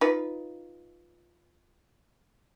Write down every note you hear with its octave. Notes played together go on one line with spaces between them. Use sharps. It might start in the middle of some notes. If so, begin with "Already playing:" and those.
D#4 F4 B4